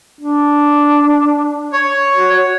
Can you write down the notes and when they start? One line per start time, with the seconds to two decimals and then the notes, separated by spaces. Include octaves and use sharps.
0.21 D4
1.73 C#5
2.17 F#4